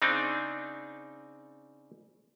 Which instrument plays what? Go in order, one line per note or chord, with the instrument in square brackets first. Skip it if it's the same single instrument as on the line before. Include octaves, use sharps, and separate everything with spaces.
[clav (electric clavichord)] C#3 C4 D4 D#4